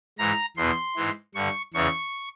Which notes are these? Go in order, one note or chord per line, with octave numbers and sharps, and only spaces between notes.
G#2 E3 A#5
E2 B2 C6
G#2 E3
G2 D3 C#6
E2 C#3 E3 C#6